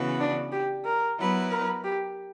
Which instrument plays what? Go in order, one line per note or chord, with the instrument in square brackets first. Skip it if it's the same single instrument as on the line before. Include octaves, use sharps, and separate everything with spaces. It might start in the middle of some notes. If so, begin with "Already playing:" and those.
Already playing: [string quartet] C#3 E3 B3 F#4 B4
[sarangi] D4
G4
A#4
[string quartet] F#3 B3 E4 B4
[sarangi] A#4
G4